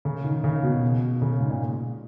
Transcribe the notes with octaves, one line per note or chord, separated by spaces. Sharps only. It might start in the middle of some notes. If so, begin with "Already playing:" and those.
C#3
D#3
C#3
B2
B2
C#3
G#2
A#2